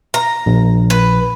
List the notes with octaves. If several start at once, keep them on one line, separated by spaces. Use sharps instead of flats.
A#5
A#1
B4